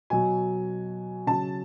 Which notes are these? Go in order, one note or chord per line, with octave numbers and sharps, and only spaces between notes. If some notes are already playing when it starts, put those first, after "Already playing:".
B2 F#3 G#5
C#3 F#3 A5